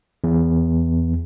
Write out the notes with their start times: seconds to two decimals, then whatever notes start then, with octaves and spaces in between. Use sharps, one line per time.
0.24 E2